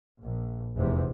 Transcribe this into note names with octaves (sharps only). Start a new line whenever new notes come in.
A#1
F1 E2 C3